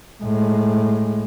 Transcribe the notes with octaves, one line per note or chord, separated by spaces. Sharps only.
A2 G#3